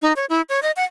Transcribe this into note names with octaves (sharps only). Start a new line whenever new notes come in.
D#4
C#5
E4
C#5
D#5
F#5